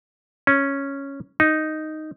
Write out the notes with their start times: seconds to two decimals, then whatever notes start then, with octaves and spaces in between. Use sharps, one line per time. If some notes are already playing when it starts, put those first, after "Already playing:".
0.47 C#4
1.40 D#4